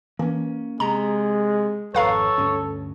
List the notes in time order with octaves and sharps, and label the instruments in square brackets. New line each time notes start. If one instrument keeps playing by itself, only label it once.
[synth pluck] E3 [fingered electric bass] A#3 C#4
[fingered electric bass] C3 [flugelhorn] G#3 [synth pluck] A#5
[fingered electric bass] G#1 F2 [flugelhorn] A4 [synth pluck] B4 F5 A#5 [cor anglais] C#5
[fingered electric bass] D2 G2 C#4